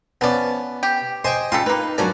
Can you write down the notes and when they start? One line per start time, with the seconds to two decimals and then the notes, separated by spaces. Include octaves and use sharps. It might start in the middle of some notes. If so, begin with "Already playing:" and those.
0.21 F3 B3 C#4 D5
0.83 G4
1.24 C5 D#5 G5 G#5 C6
1.52 C#3 G3 F4 A4 C6
1.66 A#3 D#4 B4
1.98 D3 F3 F#3 F#4 A#4 D5 G#5